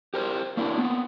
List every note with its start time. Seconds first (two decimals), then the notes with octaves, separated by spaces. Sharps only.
0.14 G4 A#4 C5
0.57 A#3 D4 E4 A#4
0.79 B3 C4